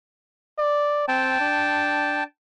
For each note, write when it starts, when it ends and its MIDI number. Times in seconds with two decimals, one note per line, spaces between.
0.58 1.04 74
1.08 1.38 60
1.08 2.24 79
1.08 2.24 81
1.41 2.24 62